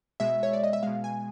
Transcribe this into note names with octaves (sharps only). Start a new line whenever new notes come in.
B2 G#3 E5
C#5
D5
D#5
E5
B2 G#3 F5
G#5